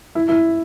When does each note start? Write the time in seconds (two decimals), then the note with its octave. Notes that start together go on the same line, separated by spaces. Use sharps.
0.15 E4
0.29 E4